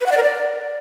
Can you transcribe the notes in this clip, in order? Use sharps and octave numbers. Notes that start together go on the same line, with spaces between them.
B4
F#5
D5
A#4
D5